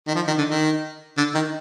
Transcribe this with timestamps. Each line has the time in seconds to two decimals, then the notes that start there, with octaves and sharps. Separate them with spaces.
0.07 D#3
0.15 F3
0.28 D#3
0.38 D3
0.50 D#3
1.18 D3
1.35 D#3